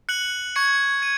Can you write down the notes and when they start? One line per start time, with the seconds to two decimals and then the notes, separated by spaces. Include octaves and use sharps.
0.09 F#6 C#7 F#7
0.56 C#6 G#6 C#7
1.02 G#6 D#7